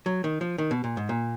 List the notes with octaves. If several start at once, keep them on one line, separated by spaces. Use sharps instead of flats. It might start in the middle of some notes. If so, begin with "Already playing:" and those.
F#3
D#3
F3
D#3
B2
A#2
G#2
A#2